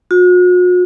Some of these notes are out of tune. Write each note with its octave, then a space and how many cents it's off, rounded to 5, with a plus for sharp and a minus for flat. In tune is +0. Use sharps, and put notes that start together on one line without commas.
F#4 -45